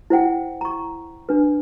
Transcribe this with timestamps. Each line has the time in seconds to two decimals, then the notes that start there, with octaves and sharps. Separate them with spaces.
0.10 E4 C5 F#5 G5
0.61 A#5 C#6
1.29 D4 B4